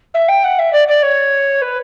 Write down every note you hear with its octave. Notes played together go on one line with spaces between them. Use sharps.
E5
G5
F#5
E5
D5
D5
C#5
B4